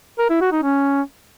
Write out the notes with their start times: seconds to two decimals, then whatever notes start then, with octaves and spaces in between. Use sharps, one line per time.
0.19 A#4
0.30 E4
0.41 F#4
0.52 D#4
0.63 C#4